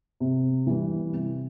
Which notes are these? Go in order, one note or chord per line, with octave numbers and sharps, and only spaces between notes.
C3
E3 G3
C3